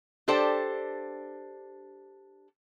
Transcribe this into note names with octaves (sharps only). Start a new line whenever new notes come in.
D4 G4 A4 C5 D5 G5